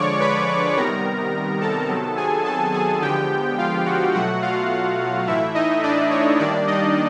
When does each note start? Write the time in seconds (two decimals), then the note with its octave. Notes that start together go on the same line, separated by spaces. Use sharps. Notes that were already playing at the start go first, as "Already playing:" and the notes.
Already playing: D3 F3 G#3 C#5 D5 C#6 D6
0.20 B4 B5
0.77 C3 D#3 G3 B3 A#4 A#5
1.61 A4 A5
1.89 C3 D#3 F#3 B3
2.17 G#4 G#5
2.45 A4 A5
2.73 G#4 G#5
3.02 D3 F3 G#3 B3 G4 G5
3.58 F4 F5
3.86 F#4 F#5
4.14 B2 F#3 A3 F#4 F#5
4.42 F4 F5
5.27 A2 E3 A3 E4 E5
5.55 D#4 D#5
5.83 D4 D5
6.11 C#5
6.39 D#3 G3 A#3 D4 D5
6.67 D#4 D#5